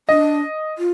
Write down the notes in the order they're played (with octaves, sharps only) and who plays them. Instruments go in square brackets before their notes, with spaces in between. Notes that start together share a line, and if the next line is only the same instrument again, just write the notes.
[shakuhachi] D4 [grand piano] D#5
[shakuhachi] F4